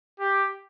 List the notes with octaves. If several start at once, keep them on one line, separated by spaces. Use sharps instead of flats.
G4